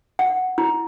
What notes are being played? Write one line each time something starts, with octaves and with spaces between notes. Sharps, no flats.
F#5
E4